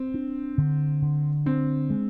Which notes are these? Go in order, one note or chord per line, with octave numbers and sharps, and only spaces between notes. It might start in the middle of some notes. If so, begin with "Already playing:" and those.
Already playing: C4
D4
D3
D3
C4 D4
G#3